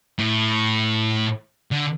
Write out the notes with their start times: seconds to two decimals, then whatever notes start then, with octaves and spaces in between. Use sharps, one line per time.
0.19 A2
1.72 D3